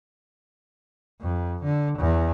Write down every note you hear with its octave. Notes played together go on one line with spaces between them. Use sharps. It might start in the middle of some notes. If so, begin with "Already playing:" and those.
F2
D3
E2